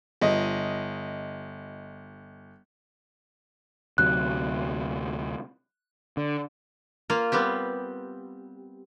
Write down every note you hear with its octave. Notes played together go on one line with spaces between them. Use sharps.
G1 D#5
D2 C3 F#3 F#6
D3
A#3 F4
G3 B3 C4 G4